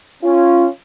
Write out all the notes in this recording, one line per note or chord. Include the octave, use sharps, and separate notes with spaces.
C#4 F4